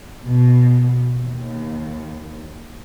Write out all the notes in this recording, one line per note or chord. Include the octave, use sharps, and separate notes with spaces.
B2
D#2